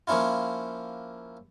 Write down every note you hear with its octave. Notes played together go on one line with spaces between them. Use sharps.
F3 A#3 C#4 E4 F4